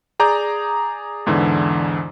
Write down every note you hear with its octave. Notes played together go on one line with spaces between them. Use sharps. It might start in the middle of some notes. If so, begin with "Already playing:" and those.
G#4 D5 A#5 D6 G6
E2 G#2 D3 E3